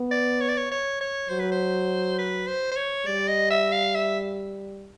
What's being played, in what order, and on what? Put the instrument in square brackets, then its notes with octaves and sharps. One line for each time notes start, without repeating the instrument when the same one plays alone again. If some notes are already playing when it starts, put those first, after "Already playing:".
Already playing: [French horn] B3
[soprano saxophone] D5
C#5
D5
C#5
C#5
C#5
[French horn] F#3 [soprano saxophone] C5
[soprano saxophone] B4
C5
B4
C5
C5
C#5
[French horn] G3 [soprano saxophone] D5
[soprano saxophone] D#5
E5
F5
E5